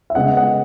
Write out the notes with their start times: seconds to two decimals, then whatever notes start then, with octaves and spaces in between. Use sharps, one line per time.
0.10 E5
0.15 C#3 G#3 B3 D#5 F#5
0.37 D#5 F#5